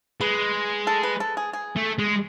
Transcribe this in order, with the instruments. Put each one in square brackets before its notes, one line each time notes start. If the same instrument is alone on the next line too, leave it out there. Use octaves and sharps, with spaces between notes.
[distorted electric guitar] G#3 [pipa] B4
[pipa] A4
B4
A4
G#4
G#4
[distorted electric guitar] A3
G#3